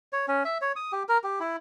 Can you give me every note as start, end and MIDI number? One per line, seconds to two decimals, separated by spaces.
0.13 0.26 73
0.28 0.43 61
0.45 0.58 76
0.62 0.72 73
0.76 0.92 87
0.92 1.03 67
1.09 1.18 70
1.23 1.39 67
1.40 1.56 64